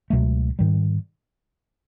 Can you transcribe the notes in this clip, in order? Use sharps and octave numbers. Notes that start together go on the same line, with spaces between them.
C#2 B2 F#3 A3
G#2 D#3 G3